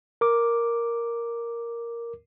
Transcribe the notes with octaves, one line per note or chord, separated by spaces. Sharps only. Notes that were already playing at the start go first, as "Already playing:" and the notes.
A#4 D6